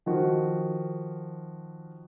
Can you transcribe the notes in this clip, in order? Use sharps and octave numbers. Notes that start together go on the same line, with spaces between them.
D#3 F3 F#4